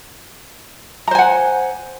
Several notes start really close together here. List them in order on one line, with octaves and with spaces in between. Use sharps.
A#5 C5 G#5 F#5